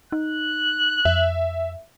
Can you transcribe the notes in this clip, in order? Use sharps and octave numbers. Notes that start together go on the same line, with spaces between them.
D#4 F#6
F2 E5